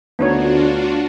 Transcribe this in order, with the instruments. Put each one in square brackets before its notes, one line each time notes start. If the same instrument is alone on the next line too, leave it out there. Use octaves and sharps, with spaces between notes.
[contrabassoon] D2 [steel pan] B3 D#4 C#5 [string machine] D4 F4 F#4